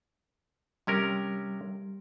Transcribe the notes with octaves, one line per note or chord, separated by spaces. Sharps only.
C3 G3 C#4 A#4